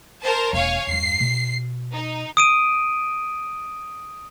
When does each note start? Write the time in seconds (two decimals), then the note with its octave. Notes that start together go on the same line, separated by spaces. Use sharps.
0.21 A#4 C5 A5
0.53 E1 A#3 C#5 F5 G#5
0.87 E2 G2 C7
1.20 B2
1.92 D#4
2.37 D#6 D7 D#7